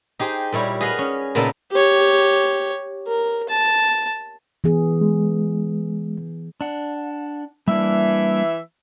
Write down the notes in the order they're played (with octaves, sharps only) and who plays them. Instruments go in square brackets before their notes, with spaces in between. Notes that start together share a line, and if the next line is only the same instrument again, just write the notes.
[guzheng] D#4 G4 G#4 C5
A#2 G3 E4 C#5
G#4 B4 D#5 F5 F#5
C#4
A#2 C#3 A#3 B3 D#4 A4
[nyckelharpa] G4 C#5
A#4
A5
[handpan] E3 B3 G#4
[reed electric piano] G#3
[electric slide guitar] D4 F#5
[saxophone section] E3 E5 [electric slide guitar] G3 A#3 D4